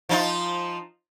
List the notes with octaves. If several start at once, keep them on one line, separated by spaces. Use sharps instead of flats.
F3 D#4 F4